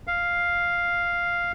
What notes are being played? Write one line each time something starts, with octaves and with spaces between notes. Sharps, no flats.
F5